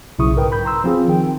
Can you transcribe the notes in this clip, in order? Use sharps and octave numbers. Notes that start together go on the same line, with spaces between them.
B1 C#3 E4 C#6 D#6
G#2 A#4 B4 G5
B5 G6
A#5 C6 E6
F3 C4 F4 G#4
D#3 G5